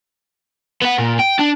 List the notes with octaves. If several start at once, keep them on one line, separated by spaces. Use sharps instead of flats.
B3 F#5
A#2
G5
D4